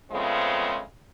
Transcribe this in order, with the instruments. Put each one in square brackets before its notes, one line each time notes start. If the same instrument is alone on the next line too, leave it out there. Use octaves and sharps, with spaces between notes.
[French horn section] C#3 F3 G#3 A3 B3 C4